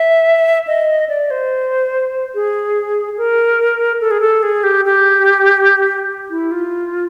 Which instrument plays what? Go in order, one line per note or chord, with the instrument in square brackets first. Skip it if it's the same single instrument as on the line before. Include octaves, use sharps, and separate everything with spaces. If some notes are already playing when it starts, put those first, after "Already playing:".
Already playing: [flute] E5
D#5
D5
C5
G#4
A#4
A4
G#4
A4
G#4
G4
G4
E4
F4